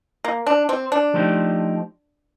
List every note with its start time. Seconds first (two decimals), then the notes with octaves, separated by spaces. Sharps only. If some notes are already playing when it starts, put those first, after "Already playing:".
0.24 A#3
0.47 D4
0.69 C4
0.92 D4
1.14 F3 A3 D#4 G4 C5